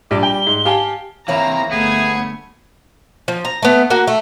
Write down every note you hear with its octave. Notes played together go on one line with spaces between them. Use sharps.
A#1 G3 D6
G5 G7
G#2
G4 F5 G#5 A5
E3 A#3 C4 E4 C#5 A#5
G1 A3 B3 G#4 G#6
F3
A#5
A3 B3
A#3 F#4
A3